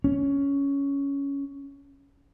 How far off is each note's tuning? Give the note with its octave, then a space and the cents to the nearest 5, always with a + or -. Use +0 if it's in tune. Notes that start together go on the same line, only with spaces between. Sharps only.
C#4 +10